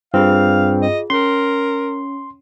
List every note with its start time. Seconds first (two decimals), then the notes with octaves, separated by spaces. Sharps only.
0.14 G2 C4 F4 G#4 F5
0.82 D#5
1.10 C#4 A#4 C6